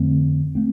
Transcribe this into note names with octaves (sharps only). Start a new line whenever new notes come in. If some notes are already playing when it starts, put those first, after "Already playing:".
Already playing: F2 D3 A3 C4
A3 C4